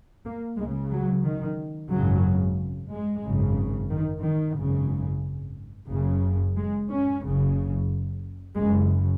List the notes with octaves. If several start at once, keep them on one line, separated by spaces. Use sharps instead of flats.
A#3
C#2 C#3 G#3
F#3
D#3
G#1 F#2 C#3 F#3
G#3
G#1 F#2 C#3
D#3
D#3
G#1 F#2 C#3
F#1 F#2 C#3
G#3
C#4
F#1 F#2 C#3
F#1 F#2 C#3 G#3